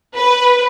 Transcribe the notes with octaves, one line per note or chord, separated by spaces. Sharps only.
B4